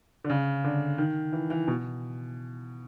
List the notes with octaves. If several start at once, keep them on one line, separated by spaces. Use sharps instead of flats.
D3
C#3
D3
D#3
E3
E3
B2